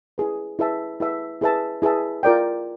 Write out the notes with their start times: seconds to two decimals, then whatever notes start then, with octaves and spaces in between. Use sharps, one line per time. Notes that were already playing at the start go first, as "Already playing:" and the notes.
0.18 E4 G#4 B4
0.59 E4 G#4 B4 E5 A5
1.00 E4 G#4 B4 E5 A5
1.41 E4 G#4 B4 E5 A5
1.82 E4 G#4 B4 E5 A5
2.23 F4 A#4 D5 G5